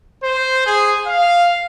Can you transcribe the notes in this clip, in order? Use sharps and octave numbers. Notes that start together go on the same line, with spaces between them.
C5
G#4
F5